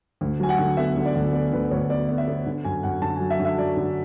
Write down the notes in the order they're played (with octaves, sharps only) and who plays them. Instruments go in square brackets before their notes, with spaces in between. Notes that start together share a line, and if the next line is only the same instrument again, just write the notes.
[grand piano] D2
F#3 G#5
F#5
D3
B3 E5
D3
D5
D2
B3 D5
D2 B4
D2 C#5
B3 D5
B3
E5
B3
D3
F#2 G#5
F#2 F#5
D3 A5
G#5
F#3
E5
D3
E5
F#3 D5
D3